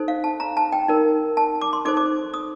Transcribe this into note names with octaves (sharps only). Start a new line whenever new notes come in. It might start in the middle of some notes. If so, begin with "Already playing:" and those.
Already playing: D#4 A4 C5
F5
A5
A#5
A5
G5
D#4 A#4
A5
D6
C6
D#4 A4 C5 D6
D6
D#6